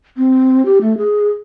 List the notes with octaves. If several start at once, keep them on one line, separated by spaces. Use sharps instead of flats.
C4
G4
A3
G#4